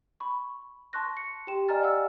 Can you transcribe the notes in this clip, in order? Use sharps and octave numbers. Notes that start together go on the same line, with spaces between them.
B5 C#6
A5 C6 C#6 F#6 A#6
C#7
G4 G5 C6 E7
D5 D#5 G#5 A#5 F6 A6
F5 F#5 E6